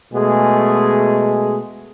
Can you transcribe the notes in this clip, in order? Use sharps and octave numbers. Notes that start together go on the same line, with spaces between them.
B2 G#3 A3 G#4